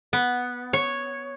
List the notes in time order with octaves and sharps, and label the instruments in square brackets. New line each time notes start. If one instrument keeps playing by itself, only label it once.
[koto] B3
C#5